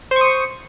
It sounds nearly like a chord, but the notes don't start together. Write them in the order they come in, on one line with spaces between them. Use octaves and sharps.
C5 C#6 D#6